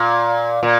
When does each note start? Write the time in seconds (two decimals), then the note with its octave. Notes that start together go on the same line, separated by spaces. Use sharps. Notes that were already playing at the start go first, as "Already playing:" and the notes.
Already playing: A#2
0.63 A#2